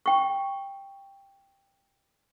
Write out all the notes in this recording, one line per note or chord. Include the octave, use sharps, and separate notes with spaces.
G5 C#6